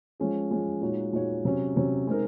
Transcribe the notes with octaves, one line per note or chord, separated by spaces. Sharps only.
F3 G#3 C#4 G#4
F3 G#3 C#4 G#4
A#2 G#3 D#4 F#4 C#5
A#2 G#3 D#4 F#4 C#5
C3 F#3 C#4
C3 F#3 C#4
G#3 C4 D#4 A#4